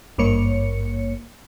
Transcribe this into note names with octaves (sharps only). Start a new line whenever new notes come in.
G#1 G2 A#3 C#5 C#7